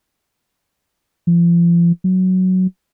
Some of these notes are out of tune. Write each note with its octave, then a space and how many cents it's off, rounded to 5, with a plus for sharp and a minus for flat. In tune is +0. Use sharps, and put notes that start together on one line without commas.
F3 -35
F#3 +5